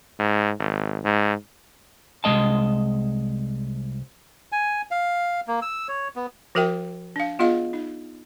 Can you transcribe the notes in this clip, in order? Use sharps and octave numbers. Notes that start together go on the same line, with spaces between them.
G#2
G#1
G#2
C2 C#3 G#3 D#5 A5
G#5
F5
A#3
E6
C#5
B3
F3 F#4 A#4 E5 G5
D4 F5
B3 F4 G#4 D#5 F5
D#4